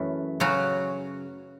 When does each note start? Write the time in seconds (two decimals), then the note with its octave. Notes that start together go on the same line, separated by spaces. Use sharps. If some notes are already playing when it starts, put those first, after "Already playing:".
Already playing: F#2 E3 A3
0.40 C#3 F#3 C#4 F#4